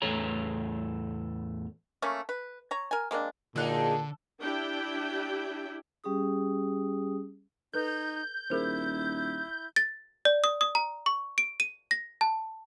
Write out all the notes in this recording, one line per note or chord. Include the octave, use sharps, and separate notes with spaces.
E2 A2 A4 C#5 A#5
A3 A#3 C#4
B4
C#5 A#5
A#4 G#5
G#3 A#3 C4 D4
A#2 D3 F#3 G#3 D#4 A4 F#6
D4 E4 G4 G5
G3 C#4 G4 G#4 D#6
D#4 A4 B4 G6
D#1 E4 G#4 A#4 C5
A6
D5
D#6
D#6
A#5
C#6
D7
D#7
A#6
A5